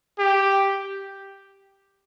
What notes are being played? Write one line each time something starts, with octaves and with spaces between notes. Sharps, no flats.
G4